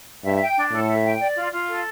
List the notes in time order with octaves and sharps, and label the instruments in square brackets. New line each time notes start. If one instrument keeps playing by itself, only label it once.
[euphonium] G2 [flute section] E5
[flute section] G5
D4
[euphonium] A2 [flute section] A4
[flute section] E5
G5
D5
F4
F4
A4